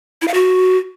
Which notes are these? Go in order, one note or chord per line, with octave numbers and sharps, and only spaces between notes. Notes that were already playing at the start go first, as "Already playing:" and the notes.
E4
F5
F#4